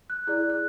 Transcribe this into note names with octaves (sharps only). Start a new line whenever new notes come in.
F#6
E4 G#4 D5 F#6
F#6